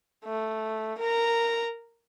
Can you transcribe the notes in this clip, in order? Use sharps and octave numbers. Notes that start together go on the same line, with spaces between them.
A3
A#4 A#5